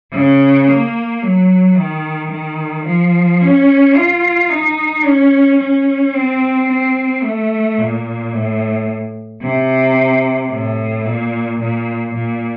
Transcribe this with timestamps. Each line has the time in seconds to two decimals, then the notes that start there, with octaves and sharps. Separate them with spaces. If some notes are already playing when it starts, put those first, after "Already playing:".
0.13 C#3
0.68 A#3
1.22 F#3
1.77 D#3
2.31 D#3
2.86 F3
3.41 C#4
3.95 F4
4.50 D#4
5.05 C#4
5.60 C#4
6.13 C4
6.68 C4
7.23 A3
7.78 A#2
8.33 A2
9.41 C3
10.51 A2
11.05 A#2
11.60 A#2
12.14 A#2